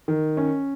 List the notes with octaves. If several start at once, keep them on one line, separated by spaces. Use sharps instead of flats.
D#3
C#4